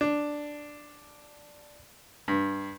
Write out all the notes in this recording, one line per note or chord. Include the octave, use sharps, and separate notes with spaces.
D4
G2